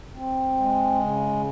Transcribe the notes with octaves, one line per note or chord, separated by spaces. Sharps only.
C4
G#3
C#3